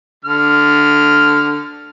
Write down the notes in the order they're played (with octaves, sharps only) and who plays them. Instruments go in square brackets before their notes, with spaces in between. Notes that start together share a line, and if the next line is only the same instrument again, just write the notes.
[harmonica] D3 F6